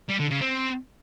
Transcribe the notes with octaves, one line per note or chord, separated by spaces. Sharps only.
G3
D3
C#3
C4